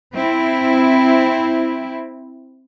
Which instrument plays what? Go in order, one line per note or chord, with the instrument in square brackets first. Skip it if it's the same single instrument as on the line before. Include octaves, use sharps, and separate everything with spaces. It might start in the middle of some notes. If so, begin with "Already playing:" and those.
[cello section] C4 E4